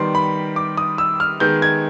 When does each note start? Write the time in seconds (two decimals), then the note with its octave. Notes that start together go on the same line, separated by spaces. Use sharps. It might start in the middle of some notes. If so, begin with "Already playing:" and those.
Already playing: D#3 G3 B3 C6
0.15 B5
0.56 D6
0.77 D#6
0.98 E6
1.20 F6
1.40 D#3 G#3 B3 G6
1.62 G#6